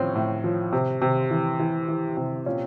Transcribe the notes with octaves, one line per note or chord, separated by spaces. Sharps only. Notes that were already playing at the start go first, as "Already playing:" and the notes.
Already playing: A2 F3 C4 C#4
A2
F3
C3
C3
E3
E3
E3
C3
A#2 C#4